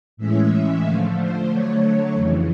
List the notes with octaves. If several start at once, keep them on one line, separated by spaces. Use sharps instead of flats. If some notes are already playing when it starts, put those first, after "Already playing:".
A2 E3 G#3 C#4 E5
D3 F3 A3 F5
C5
D3 F#3 A3 C#5
F2 C#3 E3